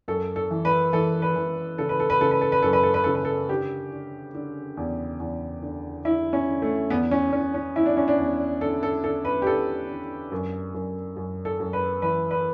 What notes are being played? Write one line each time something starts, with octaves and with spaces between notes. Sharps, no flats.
F#2 A4
A4
E3
B4
E3 A4
B4
E3
C#3 A4
B4
A4
B4
C#3 A4
B4
A4
B4
F#2 A4
B4
A4
B4
C#3 A4
B4
A4
D3 G4
D3
D3
E2
E2
D3
D3 E4
C#4
D3
A3
E2 B3
C#4
E2 C#4
C#4
E2 E4
D4
C#4
D4
E2
D3 A4
A4
D3 A4
B4
G4
D3 A4
D3
F#2
F#2
F#2
A4
F#2
B4
E3 B4
B4